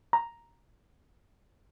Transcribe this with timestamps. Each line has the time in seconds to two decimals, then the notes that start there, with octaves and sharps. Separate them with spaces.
0.13 A#5